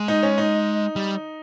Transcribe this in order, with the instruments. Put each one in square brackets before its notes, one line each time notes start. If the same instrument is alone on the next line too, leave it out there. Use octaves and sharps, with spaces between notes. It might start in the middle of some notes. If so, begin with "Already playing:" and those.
Already playing: [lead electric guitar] G#3
[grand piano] D#4
C#4
D#4
[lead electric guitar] G3